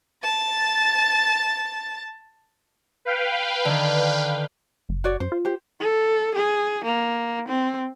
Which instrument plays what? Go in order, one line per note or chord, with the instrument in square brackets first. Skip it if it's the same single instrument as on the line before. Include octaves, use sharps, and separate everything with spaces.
[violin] A5 A6
[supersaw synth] B4 F5 G5
[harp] D3 D#3
[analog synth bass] F#1
[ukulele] F#4 C#5 D5
[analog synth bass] F#2 [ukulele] C5
[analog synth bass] F4
[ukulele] G4 C5
[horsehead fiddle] A4
G#4
A#3
C4